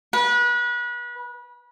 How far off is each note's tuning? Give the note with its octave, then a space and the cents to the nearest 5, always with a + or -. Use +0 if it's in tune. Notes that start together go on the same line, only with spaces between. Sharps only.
B4 -30